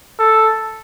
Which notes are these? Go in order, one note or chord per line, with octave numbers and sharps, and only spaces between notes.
A4